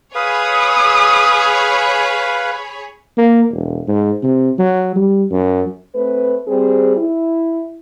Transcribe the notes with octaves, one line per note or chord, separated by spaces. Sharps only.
G#4 B4 C#5 F5 B5 D#6
A#3
E1
G#2
C3
F#3
G3
F#2
A3 C4 B4
G3 C4 G#4
E4